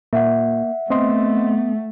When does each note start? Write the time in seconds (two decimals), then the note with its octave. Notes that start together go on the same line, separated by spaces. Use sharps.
0.13 A#2 A#3 E5 F#5
0.90 A3 B3 C4 D#5 C6